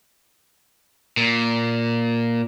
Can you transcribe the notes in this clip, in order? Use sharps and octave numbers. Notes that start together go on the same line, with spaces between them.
A#2